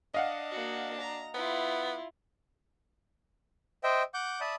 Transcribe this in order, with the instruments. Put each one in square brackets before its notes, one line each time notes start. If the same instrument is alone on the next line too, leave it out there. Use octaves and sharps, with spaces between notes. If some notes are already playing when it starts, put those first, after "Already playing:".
[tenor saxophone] D4 [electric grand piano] D#5 F5 F#5
[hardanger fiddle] A#3 F#4
A#5
[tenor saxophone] B3 [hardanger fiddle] E4 F4
[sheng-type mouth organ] C5 D#5 E5 G5
F#5 D6 G6
D5 E5 A5 B5 D#6